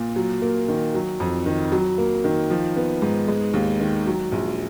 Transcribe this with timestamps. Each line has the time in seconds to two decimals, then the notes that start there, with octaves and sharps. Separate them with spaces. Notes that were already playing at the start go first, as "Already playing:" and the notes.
Already playing: A#2
0.16 F#3
0.42 A#3
0.68 D#3
0.94 F#3
1.20 F2
1.46 D#3
1.72 F#3
1.98 A#3
2.24 D#3
2.50 F3
2.76 B3
3.02 G#2
3.28 G#3
3.54 D#2
3.80 D#3
4.06 F#3
4.32 A#1